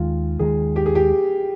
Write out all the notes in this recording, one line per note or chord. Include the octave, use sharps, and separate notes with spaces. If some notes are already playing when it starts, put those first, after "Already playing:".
Already playing: D#2 D#3 G#3 F4
D#2 D#3 G#3 G#4
G4
G#4
G4